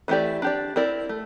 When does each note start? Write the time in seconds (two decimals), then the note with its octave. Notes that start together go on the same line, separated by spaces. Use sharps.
0.08 E3 A3 E4 G4 D5
0.42 D4 G4 D5
0.76 C4 E4 A#4 D5
1.09 A3